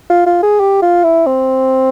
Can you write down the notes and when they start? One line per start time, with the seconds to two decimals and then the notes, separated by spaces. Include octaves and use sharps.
0.10 F4
0.26 F4
0.43 G#4
0.60 G4
0.82 F4
1.04 E4
1.26 C4